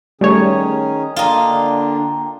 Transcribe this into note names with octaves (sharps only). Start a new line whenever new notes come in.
D#3 G3 A3 C#4 G#4 C#5
D3 A#3 D4 F4 D#5 G5 A#5